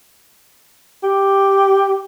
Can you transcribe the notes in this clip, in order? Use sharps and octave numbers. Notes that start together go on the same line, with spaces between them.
G4